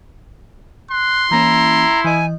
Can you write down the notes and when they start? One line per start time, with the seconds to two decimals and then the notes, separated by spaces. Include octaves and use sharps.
0.91 C6 F#6
1.31 E3 A#3 C#4 E4 A#5
2.04 E3 D#5 G#5